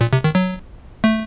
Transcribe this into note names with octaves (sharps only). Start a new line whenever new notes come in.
A#2
C3
D#3
F#3
A3